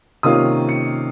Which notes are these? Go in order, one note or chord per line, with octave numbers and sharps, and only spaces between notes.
C3 D#3 A#3 C#4 F4 D#6
C#7